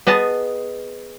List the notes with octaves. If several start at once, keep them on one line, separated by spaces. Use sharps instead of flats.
B3 G#4 D#5 A5